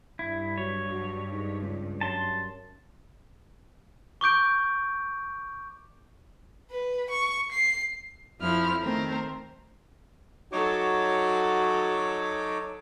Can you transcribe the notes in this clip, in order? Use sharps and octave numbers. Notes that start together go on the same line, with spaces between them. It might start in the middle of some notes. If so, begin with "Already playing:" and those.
G2 E4
F#3 C#5
F#3
G#2
C#2
F#2 A5 C6
C#6 D6 G6 D7
B4
C#6
C7
F2 F3 E4 F6
D#3 A3 C4 A#4 C5
F#3 D#4 F#4 A4 C#5 D6